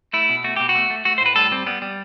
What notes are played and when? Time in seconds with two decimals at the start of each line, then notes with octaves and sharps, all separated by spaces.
0.13 A3 E4
0.29 B2
0.44 A3 F#4
0.56 B2 G4
0.69 F#4
0.75 A3
0.90 A3
1.05 A3 F#4
1.18 C5
1.21 A2 B4
1.36 G3 A4
1.51 G3 C4
1.66 G3 B3
1.82 G3